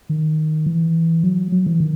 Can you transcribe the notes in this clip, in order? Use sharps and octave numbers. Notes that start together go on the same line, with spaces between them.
D#3
E3
F#3
F#3
E3
D#3